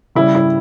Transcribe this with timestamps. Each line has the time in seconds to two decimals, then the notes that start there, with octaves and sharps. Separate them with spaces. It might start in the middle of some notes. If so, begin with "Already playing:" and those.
0.15 C#3 G3 E4
0.35 E4